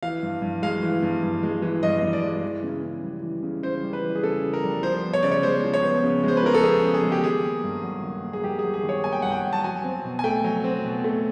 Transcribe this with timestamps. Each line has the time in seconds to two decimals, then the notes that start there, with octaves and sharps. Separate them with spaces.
0.03 E3 F5
0.23 G2
0.42 G2
0.62 G#3 F5
0.83 E3
1.03 G2
1.23 G2
1.43 G#3
1.62 E3
1.83 G2 D#5
2.03 G2
2.13 D5
2.23 G#3
2.43 E3
2.63 C#3
2.83 C#3
3.03 G3
3.23 E3
3.43 C#3
3.63 C#3 C5
3.83 G3
3.93 B4
4.04 E3
4.15 G#4
4.23 C#3 A4
4.43 C#3
4.53 A#4
4.64 G3
4.83 F3 C5
5.03 B3
5.13 C#5
5.23 C#3 D5
5.32 C#5
5.43 G#3 C5
5.64 F3
5.74 C#5
5.83 B3
6.04 C#3
6.24 G#3 C5
6.37 B4
6.43 F3 A#4
6.55 A4
6.64 B3 G#4
6.84 C#3
6.94 G#4
7.03 G#3
7.12 G4
7.24 D#3 G#4
7.44 A#3
7.64 G2
7.83 F#3
8.03 D#3
8.24 A#3
8.33 G#4
8.44 G2 G4
8.59 G#4
8.64 F#3
8.74 G#4
8.83 D#3
8.89 C#5
9.04 A#3 G#5
9.13 G5
9.22 G2 F#5
9.32 G5
9.44 F#3
9.53 A5
9.64 F#3 G#5
9.84 C4
10.04 B2
10.19 G#5
10.24 A3 G5
10.44 F#3
10.64 C4
10.84 B2
11.04 A3